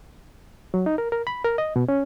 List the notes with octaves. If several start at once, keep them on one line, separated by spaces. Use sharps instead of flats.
F#3
D#4
A#4
A#4
B5
A#4
D#5
B2
C#4